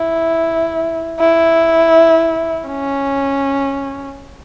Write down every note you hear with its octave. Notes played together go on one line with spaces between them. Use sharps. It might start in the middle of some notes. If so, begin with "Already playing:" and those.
Already playing: E4
E4
C#4